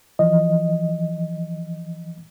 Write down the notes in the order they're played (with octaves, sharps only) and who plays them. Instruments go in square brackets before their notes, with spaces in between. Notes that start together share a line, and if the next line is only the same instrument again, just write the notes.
[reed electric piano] E3 F3 D#5